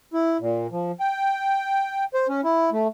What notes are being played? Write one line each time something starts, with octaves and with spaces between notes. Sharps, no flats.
E4
A#2
F3
G5
C5
C#4
E4
A3